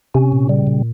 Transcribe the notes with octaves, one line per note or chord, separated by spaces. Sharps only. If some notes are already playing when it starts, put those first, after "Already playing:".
C3 C#4
A#2
C#3 G3
A#2